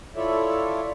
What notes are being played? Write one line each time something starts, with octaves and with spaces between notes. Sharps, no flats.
E4 F4 A4 C#5 D5 E5